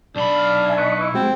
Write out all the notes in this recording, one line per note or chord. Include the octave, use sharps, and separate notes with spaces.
B1 D4 B5
F5
E5 G#5
B4 D#5 C#6
E4
G#3 C4 F#4